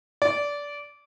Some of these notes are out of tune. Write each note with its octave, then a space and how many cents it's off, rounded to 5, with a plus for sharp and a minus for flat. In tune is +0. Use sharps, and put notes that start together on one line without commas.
D5 -20